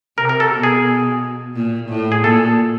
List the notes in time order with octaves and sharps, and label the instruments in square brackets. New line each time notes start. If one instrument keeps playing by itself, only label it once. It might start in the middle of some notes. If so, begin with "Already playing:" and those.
[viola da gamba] C3 [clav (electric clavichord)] A#4
[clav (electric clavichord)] A#4
A4
[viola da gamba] B2
[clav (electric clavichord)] G#4
[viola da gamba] A#2
A2
[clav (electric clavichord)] G#4
[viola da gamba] A#2 [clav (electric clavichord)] A4